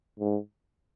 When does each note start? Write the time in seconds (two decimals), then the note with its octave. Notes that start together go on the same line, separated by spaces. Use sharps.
0.20 G#2